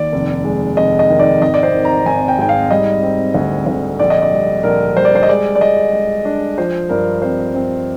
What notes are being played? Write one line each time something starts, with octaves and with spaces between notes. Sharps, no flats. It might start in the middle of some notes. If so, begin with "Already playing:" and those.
Already playing: D#2 D5
F1
G#3
F1 D#5
D#5
D#3
D5
G#1 D#5
D5
C5
D#3
A#5
G#1 G#5
G5
G#2 G5
F5
G3 D#5
C4
D2
D2
A#1 D5
D#5
D5
G3
A#1 A#4
G3 C5
D5
C5
D#5
G#3 D5
D5
G#3 D#5
G#3
D4
F3 C5
G2 A#4
C4 C5
C4